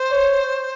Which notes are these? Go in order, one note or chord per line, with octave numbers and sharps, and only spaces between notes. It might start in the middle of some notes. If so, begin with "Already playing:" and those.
Already playing: C5
C#5